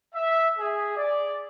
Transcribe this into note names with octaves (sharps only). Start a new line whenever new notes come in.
E5
G#4
D5